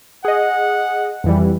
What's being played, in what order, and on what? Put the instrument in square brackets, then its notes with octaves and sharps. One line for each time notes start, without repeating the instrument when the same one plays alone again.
[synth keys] G#4 D#5 [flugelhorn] F#5
[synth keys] F2 E3 G3